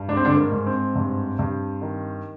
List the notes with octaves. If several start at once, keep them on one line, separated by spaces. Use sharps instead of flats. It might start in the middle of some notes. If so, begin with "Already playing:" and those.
Already playing: G2
G#2 D4
C4
D3 D4
A#3
G#2
C4
G2
G2
D#3